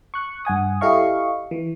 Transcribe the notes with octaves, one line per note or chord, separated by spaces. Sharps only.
C#6 F#6
G2 F#5 G#5 D#6
E4 G4 A4 D#5 F5 C#6
E3